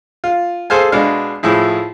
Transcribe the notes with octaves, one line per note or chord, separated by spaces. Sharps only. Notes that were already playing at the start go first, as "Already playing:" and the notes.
F4
G#4 A4 C5 F5 G#5
B2 G#3 D4 F5
A2 F3 E4 G#4